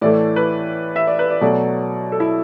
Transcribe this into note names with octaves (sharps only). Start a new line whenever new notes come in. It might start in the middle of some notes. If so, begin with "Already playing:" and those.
A2 E3 A3 D5
B4
E5
D5
B4
D5
B2 F#3 A3 D5
A4
E4